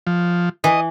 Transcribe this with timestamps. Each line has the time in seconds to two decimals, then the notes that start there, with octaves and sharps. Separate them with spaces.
0.07 F3
0.64 E3 D#5